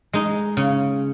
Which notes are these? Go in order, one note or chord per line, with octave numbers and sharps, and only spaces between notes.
G#3 D#4
C#3